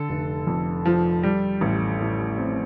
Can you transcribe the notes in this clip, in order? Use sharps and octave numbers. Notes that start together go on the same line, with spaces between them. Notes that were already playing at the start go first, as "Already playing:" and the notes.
Already playing: D3 A4
F1
F2
F3
G3
A1
A2
C4